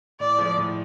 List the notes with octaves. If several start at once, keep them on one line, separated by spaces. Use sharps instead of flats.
A2 D5
F3 G#3
A2